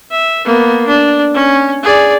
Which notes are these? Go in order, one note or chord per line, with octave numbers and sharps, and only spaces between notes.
E5
A#3 B3
D4
C#4
G#4 D5